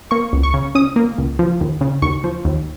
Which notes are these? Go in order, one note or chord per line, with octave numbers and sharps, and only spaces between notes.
A#3 C#6
C#2
C#6
C#3
C#4 D#6
A#3
C#2
F3
D#2
C#3
D#2 C#6
F3
D#2